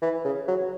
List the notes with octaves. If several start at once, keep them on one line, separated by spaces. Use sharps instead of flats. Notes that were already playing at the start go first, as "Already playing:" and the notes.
E3
C#3
F#3